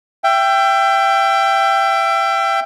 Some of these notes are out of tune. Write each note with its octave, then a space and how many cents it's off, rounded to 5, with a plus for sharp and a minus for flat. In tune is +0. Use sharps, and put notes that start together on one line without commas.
E5 +30 G5 +0